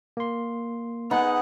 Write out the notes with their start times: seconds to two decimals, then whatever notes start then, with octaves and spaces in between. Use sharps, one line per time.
0.17 A#3 C6
1.11 B3 D#4 G#4 F#5